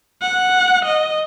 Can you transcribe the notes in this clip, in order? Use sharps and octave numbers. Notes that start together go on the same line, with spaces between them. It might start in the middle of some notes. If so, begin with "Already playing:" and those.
F#5
D#5